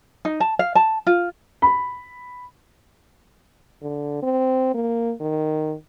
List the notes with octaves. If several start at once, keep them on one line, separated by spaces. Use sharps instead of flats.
D#4
A5
F5
A5
F4
B5
D3
C4
A#3
D#3